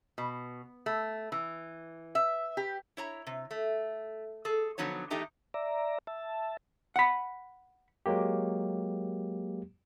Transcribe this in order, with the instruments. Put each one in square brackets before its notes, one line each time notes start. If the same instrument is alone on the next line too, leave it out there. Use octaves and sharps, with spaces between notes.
[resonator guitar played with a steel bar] B2
A3
E3
E5
G4
E4 C#5 A#5
C3
A3
G#4 A4
D3 F3 F#3 B3 D#4 C#5
E2 G#3 A3 D#4 G4 A#5
[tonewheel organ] D5 E5 A#5
E5 A5
[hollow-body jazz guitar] F#5 B5
[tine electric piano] F#3 G#3 A#3 G4